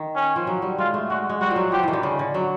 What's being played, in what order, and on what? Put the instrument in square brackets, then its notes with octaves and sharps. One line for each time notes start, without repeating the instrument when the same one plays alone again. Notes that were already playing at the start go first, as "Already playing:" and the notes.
Already playing: [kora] D#3
[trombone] C#4
[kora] F3
F#3
G3
[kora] G#3 [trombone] F4
[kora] A3
[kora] G#3 [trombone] F#4
[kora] G#3
[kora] G3 [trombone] F#4
[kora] F3
F#3
[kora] F3 [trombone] G4
[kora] D#3 E3
D3
C#3
D3
F#3